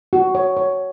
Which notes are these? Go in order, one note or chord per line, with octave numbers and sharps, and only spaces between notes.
F#4
C#5
C#5